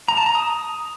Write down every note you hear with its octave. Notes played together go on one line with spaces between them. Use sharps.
A#5
A5
A#5
D#6